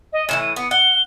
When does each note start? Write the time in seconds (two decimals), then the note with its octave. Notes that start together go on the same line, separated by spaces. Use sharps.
0.13 D#5
0.29 A2 D#3 E3 E7
0.41 D#7
0.56 B3 D#6
0.71 F#5 G7